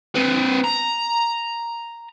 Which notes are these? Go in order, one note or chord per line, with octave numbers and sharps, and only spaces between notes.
C4 B4
A#5